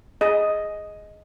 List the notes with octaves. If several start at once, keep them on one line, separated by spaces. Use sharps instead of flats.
G#4 D#5